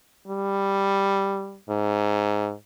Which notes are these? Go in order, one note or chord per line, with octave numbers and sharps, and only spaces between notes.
G3
G#2